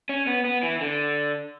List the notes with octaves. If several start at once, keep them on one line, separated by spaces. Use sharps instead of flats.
C#4
B3
B3
E3
D3